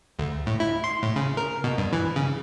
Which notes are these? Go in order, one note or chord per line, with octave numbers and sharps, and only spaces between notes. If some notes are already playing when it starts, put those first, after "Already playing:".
D2
A2
E4
C6
A2
C#3
A#4
B2
G2
E3
C#3